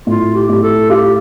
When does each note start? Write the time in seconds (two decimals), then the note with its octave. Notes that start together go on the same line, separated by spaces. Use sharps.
0.07 A2 F4
0.35 G4
0.49 A2
0.63 A4
0.90 F4 G4